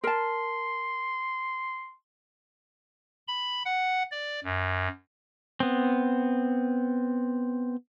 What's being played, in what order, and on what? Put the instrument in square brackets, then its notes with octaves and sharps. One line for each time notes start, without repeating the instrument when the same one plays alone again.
[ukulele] A#4 A5 [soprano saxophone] C6
[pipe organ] B5
F#5
D5
F#2
[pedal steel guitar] B3 C4